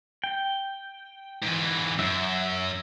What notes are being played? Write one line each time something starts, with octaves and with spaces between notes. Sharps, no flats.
G5
G#2 E3
F#2 E5